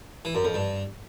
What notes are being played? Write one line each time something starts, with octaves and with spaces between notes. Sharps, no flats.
E3
F#2
F2
G2